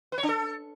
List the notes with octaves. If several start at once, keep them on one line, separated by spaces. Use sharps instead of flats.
B4
C#5
D4
A4